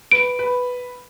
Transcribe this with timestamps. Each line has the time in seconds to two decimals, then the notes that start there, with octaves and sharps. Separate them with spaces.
0.11 B4 D7
0.39 B4